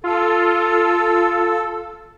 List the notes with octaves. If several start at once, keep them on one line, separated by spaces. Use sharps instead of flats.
F4 A4